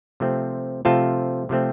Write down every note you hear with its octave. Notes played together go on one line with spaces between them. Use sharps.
C3 F3 A3 C4
C3 F3 A3 C4 F4 A4
C3 F3 A3 C4